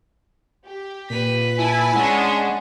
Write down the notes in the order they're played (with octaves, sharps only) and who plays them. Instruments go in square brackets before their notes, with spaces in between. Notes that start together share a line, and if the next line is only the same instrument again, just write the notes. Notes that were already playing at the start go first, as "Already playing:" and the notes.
[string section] G4
[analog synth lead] A#2 [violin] B4 B6
[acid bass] E4 [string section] G#5 A5 B5
[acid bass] G#3 [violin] C#4 D4 [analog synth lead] F#5